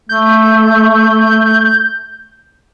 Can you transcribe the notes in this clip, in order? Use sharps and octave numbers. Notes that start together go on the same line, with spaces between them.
A3 G6